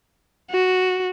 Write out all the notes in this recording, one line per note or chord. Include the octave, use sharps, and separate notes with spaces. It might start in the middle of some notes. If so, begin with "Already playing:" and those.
F#4